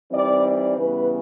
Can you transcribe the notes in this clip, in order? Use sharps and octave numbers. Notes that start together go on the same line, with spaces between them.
E3 G3 C4 D#4 D5
D5
C#3 E3 G3 B3 B4